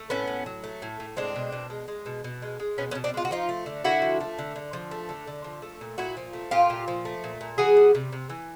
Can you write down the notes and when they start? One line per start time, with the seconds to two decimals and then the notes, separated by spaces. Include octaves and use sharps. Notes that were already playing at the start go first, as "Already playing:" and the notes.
Already playing: A3
0.10 A2 B3 C#4
0.27 A2
0.46 F#3
0.64 A3
0.82 A2
1.00 A2
1.17 G#3 C4 D4
1.36 B2
1.52 B2
1.70 G#3
1.88 G#3
2.06 B2
2.24 B2
2.42 G#3
2.60 G#3
2.78 B2 B3 C#4
2.91 B3 C#4
2.95 B2
3.04 C4 D4
3.14 G#3 F4
3.25 F#4
3.31 F3 D#4 F4
3.49 A3
3.66 D3
3.84 D3 E4 F#4
4.02 F3
4.20 A3
4.38 D3
4.56 D3
4.73 F3
4.91 A3
5.09 D3
5.27 D3
5.44 F3
5.62 A3
5.81 A#2
5.98 A#2 E4 F#4
6.17 F3
6.33 A3
6.51 A#2 F4 G4
6.70 A#2
6.88 F3
7.05 A3
7.24 A#2
7.41 A#2
7.58 E3 F#4 G#4
7.77 G3
7.95 C3
8.12 C3
8.30 E3